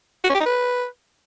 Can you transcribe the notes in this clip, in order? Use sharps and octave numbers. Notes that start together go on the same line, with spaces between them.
F#4
C#4
G4
D#4
B4